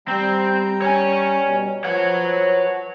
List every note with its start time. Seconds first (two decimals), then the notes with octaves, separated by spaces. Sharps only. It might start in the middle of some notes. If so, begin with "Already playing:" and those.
0.08 G3 C4 G5 A#5
0.82 C#5 G#5
1.43 B2 G3
1.84 F3 B4 C#5 F#5